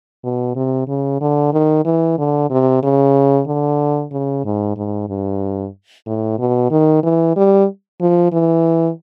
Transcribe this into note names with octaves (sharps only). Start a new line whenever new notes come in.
B2
C3
C#3
D3
D#3
E3
D3
C3
C#3
D3
C#3
G#2
G#2
G2
A2
B2
D#3
E3
G3
F3
E3